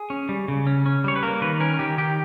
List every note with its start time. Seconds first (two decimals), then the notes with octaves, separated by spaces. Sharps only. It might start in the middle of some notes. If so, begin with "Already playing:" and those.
Already playing: G#4
0.10 C#4
0.29 G3
0.48 C#3
0.67 C#4
0.86 C#4
1.04 G3 C#5
1.16 B4
1.23 A#3 A#4
1.42 D#3 B4
1.60 C#4 A#4
1.79 D#3 G4
1.98 D#3 G4